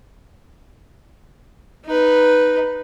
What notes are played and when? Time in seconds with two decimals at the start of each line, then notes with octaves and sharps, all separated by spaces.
1.86 D#4 B4